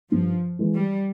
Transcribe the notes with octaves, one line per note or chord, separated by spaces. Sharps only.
G2 F3
E3 G#3
G3